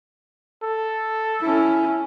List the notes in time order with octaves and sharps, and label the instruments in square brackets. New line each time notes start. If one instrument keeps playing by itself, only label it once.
[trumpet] A4
[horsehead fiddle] C#4 E4